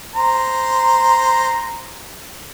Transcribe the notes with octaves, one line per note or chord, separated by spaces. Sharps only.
C5 A#5